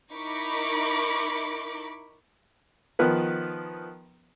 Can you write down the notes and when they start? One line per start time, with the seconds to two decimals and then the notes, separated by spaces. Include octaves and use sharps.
0.13 D#4 E4 A#4 B5 C#6 D6
2.99 D#3 F3 B3 B4